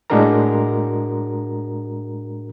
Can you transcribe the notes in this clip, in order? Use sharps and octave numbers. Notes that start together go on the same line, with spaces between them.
A2 G#3 D4 F#4 A#4 A#5